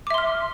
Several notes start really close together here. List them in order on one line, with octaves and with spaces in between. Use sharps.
D6 E5 C6 F6